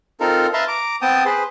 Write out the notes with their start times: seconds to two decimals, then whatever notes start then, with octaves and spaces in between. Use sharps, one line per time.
0.20 C4 D#4 F4 A4 A#4
0.54 B4 E5 F5 A5 A#5 C6
0.68 A#5 D6
1.02 B3 C4 G5 A5 D#6
1.25 G#4 B4 C5